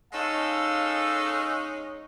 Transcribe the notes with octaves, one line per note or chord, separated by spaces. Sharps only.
G#3 C#4 D#4 A4 F5 E6